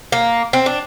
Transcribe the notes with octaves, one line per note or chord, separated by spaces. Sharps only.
A#3
C4
D4